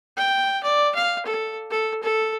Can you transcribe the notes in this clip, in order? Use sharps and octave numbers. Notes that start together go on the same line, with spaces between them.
G5
D5
F5
A4
A4
A4